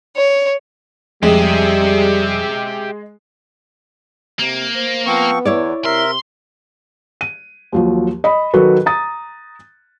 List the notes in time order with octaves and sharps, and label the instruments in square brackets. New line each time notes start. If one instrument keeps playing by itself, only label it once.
[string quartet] C#5
[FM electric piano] F2 D#6 [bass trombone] G3 [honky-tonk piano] G#3 [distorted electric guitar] G4 E5
[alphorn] C3 [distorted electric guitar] A#3
[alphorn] C5
[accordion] F3 C4 C#6 [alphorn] B3
[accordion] E2 [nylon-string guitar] E4 C#5 D5
[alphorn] C3 [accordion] A#4 E5 [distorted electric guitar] C6
[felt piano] D#7
D#2 F3 F#3
D#5 B5
D#3 F#3 F#4 A4 B4
A#5 D#6 A6